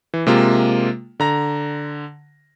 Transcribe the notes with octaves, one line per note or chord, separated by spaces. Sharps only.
E3
C3 G#3 A#3 F4
D3 A#5 A#6